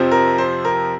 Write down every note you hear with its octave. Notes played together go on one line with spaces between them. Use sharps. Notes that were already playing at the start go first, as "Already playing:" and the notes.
Already playing: F2 C3 F3 C4
A#4
C5
A#4